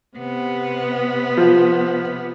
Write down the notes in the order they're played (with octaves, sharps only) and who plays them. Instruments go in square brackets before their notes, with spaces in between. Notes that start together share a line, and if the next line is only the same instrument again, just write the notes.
[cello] C3 B3
[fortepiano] F3